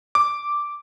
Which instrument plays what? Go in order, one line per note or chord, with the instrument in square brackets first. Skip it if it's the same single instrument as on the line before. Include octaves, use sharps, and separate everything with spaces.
[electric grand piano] D6